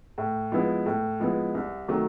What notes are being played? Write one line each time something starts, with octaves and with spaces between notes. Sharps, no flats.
A2
F3 G#3 B3 E4
A2
F3 G#3 B3 E4
C2
C3 D#3 F#3 A3